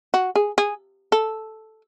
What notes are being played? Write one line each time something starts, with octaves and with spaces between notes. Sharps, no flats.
F#4
G#4
G#4
A4